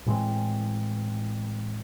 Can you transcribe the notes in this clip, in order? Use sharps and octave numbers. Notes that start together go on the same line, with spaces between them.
A2 E3 G#3 C4